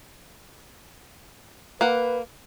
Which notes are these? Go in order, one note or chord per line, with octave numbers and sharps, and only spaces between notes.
A#3 B4 F#5